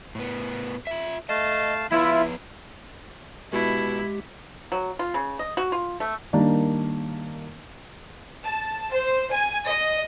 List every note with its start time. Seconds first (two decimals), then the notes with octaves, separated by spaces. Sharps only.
0.15 A2 B3
0.87 F4 E5
1.29 A3 D#5 F5 A5
1.92 F3 B3 E4 F4 B4
3.53 B2 G#3 E4 G4
4.72 F#3
4.99 F4
5.14 C#3
5.39 D#5
5.57 F#4
5.72 F4
6.00 A3
6.33 D#3 G3 A#3 D4
8.43 A5
8.93 C5
9.31 G#5
9.67 D#5